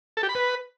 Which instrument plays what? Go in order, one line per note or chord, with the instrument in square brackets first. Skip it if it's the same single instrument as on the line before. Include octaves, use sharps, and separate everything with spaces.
[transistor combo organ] A4
G4
B5
B4